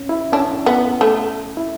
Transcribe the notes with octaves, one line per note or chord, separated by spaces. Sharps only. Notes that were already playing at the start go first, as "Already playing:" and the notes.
Already playing: C#4
E4
C#4 D4
B3
A3
E4